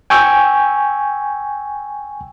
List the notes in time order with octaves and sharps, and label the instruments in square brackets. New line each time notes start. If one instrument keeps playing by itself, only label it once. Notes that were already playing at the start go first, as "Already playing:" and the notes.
[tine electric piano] G5 G#5 C#6 E6